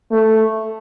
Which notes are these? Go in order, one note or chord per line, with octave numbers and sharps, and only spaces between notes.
A3